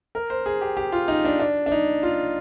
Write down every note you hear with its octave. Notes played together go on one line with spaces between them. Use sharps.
A#4
C5
G#4
G4
G4
F4
D#4
D4
D4
D4
D#4
F4